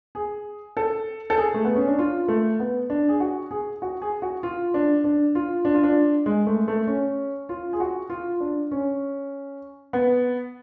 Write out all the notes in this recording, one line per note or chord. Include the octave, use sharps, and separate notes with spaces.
G#4
A4
A4
G#4
A3
B3
C#4
D4
F4
A3
B3
D4
G#4
F#4
G#4
F#4
G#4
F#4
F4
D4
D4
F4
D4
F4
D4
G#3
A3
A3
C#4
F4
G#4
F#4
F4
D4
C#4
B3